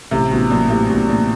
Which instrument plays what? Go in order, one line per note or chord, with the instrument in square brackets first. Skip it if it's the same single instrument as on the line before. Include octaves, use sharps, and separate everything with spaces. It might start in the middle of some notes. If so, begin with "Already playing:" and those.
[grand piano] A1 [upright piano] C3
[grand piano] A1 [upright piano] B2
[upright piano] A#2 [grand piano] F#3
[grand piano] A2 [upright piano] C3
[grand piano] A1 [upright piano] B2
[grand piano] A1 [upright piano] A#2